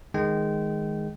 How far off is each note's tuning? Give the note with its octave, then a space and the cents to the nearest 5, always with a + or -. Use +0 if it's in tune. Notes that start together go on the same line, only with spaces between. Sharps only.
D#3 +0 G#3 +0 G5 -25